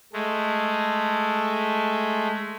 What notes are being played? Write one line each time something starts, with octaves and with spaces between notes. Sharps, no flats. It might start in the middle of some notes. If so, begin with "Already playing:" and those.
G#3 A3